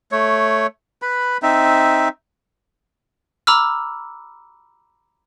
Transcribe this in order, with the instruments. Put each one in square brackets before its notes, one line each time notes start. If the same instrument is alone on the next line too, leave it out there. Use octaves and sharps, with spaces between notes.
[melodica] A3 C#5
B4 B5
C4 D#4 E5
[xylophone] A#5 B5 D6 E6 F6